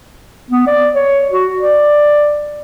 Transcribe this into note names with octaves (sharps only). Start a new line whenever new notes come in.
B3
D5
C#5
F#4
D5